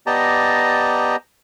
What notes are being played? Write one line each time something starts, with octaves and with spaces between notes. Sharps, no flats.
B3 G4 D5 D#5 A5 A#5